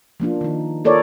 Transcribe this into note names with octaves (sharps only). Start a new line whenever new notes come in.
F3 A#3 D4 F4
D#3 D#4
A#3 F4 A4 A#4 C#5 D5